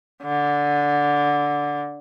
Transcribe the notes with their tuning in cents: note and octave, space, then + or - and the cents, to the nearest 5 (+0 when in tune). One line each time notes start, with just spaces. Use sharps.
D3 -10